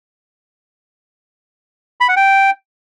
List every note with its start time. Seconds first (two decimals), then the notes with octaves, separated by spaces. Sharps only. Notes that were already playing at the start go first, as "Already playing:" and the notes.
2.01 B5
2.09 F#5
2.17 G5